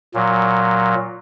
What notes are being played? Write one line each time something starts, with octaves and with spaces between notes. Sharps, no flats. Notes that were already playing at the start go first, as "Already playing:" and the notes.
A#2 F#3